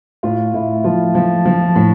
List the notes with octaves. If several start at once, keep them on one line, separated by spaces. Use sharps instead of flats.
A2 F4
A2 E4
F3 F4
F3
F3
A2